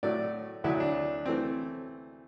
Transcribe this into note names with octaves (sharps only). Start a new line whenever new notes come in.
A2 F#3 A3 D5
D2 D3 F#3 A3 E4
D4
E3 A3 C4